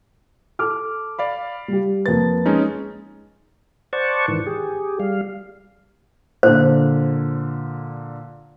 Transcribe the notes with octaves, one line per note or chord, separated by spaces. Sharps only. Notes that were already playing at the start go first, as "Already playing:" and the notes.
A4 D6 F6
D5 F5 B5
G3 G4
F2 A#3 B4 A6
G#3 C#4 D#4
C5 D5 F#5 A5 C#6
G#2 D#3 E3
G4 G#4
G3 F5
A#2 D3 C5